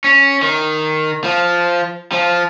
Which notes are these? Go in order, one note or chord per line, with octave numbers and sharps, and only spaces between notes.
C#4
D#3
F3
F3